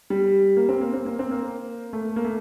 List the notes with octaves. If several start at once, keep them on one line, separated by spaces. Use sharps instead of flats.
G3
A#3
C4
A#3
C4
A#3
C4
A#3
A3
A#3
A3